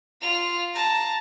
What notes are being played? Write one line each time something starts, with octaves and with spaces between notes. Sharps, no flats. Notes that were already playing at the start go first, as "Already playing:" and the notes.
F4 F7
A5 A#5